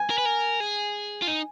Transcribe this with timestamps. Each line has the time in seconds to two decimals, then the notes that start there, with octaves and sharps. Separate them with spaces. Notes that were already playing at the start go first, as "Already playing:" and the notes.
Already playing: G#5
0.10 A#4
0.18 B4
0.25 A#4
0.60 G#4
1.22 F4
1.28 D#4